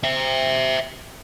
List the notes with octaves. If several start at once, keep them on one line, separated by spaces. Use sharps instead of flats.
C5 E5